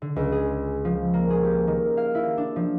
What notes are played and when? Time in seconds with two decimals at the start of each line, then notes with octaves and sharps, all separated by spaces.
0.02 D3
0.16 C#2
0.32 G#4
0.85 F3
1.14 A#3
1.30 G#4
1.44 G4
1.67 D#3
1.97 F5
2.15 E4
2.38 D4
2.56 F3